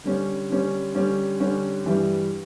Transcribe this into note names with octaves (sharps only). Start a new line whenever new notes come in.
D3 G3 C#4
D3 G3 C#4
D3 G3 C#4
D3 G3 C#4
G2 E3 G3